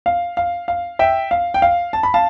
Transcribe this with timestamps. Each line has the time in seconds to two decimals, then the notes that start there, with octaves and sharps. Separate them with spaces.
0.06 F5
0.37 F5
0.68 F5
0.99 E5 G5
1.31 F5
1.54 G5
1.62 F5
1.93 A5
2.03 B5
2.14 F5 A5